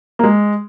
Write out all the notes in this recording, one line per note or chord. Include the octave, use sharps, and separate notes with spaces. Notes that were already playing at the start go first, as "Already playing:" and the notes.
A#3
G#3